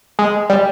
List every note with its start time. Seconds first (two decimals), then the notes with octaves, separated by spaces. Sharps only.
0.19 G#3
0.50 G3